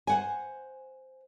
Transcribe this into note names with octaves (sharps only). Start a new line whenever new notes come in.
C5 F#5 G#5